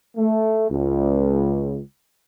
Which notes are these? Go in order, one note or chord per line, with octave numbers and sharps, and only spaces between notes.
A3
C#2